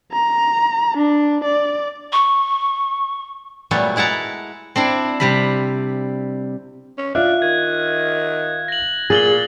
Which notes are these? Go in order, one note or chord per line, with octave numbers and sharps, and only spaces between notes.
A#5
D4
D5
C#6
A#2 F#3 G3 A3 B3
G#3 E4 F#5 A5 A#5
C4 D4 E4
C3 G3 B5
C#4
D4 F4 E5 F5 F#6
D#3 G#6
A#6 F#7
A#2 G#4 A6 F#7 G7